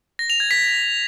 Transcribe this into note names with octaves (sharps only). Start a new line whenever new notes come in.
A#6
F7
G#6
B6